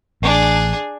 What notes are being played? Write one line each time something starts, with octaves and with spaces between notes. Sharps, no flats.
A1 D4 G#4